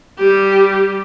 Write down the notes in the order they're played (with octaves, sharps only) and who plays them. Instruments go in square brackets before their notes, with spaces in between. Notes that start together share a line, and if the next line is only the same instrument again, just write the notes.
[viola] G3 G4